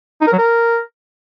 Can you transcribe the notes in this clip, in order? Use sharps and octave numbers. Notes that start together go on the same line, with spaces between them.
D#4
A#4
F#3
A#4